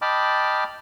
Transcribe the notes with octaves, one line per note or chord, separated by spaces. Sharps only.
D#5 G5 A5 B5 D6 F6